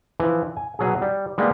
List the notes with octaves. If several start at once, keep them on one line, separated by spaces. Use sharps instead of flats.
E3 F3
G#5
B2 F#3 G#4
G3
G3 G#3 A#3 B3